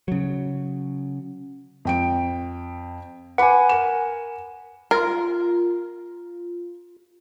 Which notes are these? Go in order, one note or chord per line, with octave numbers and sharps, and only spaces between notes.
C#3 F#3
F2 G5 D7
B4 F#5 G#5 B5 D6
A#4 E7
F4 A#4